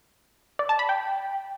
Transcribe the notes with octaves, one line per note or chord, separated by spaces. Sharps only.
D5
A5
B5
G5